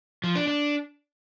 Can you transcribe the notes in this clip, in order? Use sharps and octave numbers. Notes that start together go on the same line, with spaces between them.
F3
D4
D4